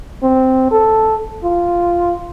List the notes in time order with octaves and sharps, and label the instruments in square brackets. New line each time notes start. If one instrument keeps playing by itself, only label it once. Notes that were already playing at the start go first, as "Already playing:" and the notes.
[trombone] C4
A4
F4